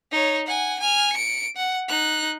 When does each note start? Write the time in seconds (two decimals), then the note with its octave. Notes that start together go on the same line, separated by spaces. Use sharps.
0.12 D#4 C#5
0.47 F#5 G#5
0.80 G#5 F6
1.13 C#7 D7
1.57 F#5
1.89 D#4 F#6